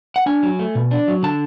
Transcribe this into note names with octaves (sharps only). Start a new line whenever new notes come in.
F#5
D4 G#5
F#3
A3
B2
D4
F#3
D3 A5